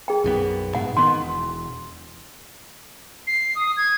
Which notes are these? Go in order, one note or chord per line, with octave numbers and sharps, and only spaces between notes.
G#4 G5
B1 F#2 B3
G#2 B2 F#5
D#3 B3 C6
E1
C7
D#6
G#6